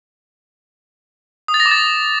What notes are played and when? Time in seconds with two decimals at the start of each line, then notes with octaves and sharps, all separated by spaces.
1.48 D#6
1.54 A6
1.60 A#6
1.66 D6
1.71 A6